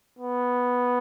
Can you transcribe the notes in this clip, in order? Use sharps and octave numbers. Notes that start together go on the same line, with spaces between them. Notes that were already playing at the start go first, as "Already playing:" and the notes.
B3